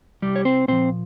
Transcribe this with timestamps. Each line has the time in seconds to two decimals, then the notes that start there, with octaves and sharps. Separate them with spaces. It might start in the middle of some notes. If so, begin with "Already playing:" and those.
0.22 C2 G3 G4
0.36 C#5
0.45 C4 C5
0.68 A#2 F3 C4 C5